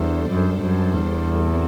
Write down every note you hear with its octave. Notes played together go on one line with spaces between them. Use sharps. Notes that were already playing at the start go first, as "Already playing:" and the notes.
Already playing: E2 G3 D4 A4 C5
F#2
F#2
E2
A2 G3 C4 F#4 A4